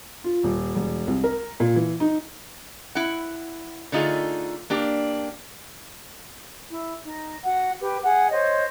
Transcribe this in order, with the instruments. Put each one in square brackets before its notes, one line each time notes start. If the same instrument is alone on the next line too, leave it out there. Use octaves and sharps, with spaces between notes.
[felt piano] F4
D#1
E1
C2
A#4
A#2
E3
D#4
[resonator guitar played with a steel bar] E4 F#5
D3 A3 D#4 F4 G#4
A#3 D4 G4
[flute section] E4
D#4
F#4 F#5
G4 B4
G#4 F#5
C5 C#5 D#5